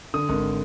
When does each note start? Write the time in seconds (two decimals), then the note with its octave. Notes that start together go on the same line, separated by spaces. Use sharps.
0.14 D3 D#6
0.29 G#1